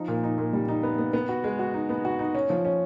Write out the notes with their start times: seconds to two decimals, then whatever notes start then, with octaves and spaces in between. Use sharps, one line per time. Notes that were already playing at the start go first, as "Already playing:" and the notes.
Already playing: F3 D#4
0.08 A#2
0.23 D#4
0.38 A#2
0.53 G3
0.68 D#4
0.83 B3
0.99 B3
1.13 B3
1.29 F#4
1.44 G#3
1.59 F#4
1.74 D#4
1.89 B3
2.05 F#4
2.19 D#4
2.35 C#4
2.50 F3
2.65 C#4